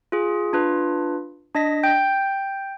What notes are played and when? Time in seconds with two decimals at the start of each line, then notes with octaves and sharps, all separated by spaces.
0.12 F4 G#4
0.53 D4 F4 B4
1.55 D4 D#5 A#6 B6
1.83 G5 G6